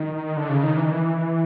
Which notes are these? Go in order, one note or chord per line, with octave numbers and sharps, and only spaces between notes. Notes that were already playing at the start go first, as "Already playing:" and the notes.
Already playing: D#3
D3
C#3
D#3
E3
D#3
E3